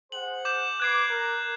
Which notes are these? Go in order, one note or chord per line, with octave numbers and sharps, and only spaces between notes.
G#4 C5 F#5 F#7
D6 G6 E7
B4 D6 F#6 G#6 C7
A#4